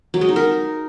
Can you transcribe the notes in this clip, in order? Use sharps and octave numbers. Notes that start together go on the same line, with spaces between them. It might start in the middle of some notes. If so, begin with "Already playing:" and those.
F#3
G#3
D#4
A#4